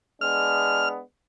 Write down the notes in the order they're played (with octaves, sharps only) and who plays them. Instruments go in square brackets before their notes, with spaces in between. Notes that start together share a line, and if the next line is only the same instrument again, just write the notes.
[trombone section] G#3 B3 D4 [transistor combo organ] F6